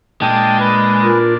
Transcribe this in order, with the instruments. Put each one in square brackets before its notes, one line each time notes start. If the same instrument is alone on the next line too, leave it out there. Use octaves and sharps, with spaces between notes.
[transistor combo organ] A#2 D4 [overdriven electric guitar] G#3 [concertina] G5 A5
[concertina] B4
[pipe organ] F4 A#4